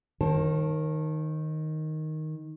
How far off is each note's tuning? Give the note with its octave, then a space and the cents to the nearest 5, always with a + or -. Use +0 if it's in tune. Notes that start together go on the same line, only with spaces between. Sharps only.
D#3 +0 C5 +45 A5 +0